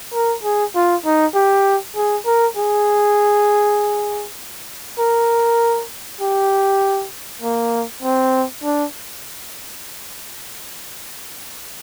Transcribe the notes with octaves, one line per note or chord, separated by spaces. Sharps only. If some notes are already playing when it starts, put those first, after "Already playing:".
A#4
G#4
F4
D#4
G4
G#4
A#4
G#4
A#4
G4
A#3
C4
D4